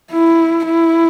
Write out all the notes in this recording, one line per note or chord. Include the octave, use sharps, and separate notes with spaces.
E4
E4